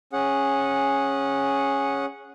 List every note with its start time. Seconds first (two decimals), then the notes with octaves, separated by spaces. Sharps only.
0.13 C#4 G#4 F#5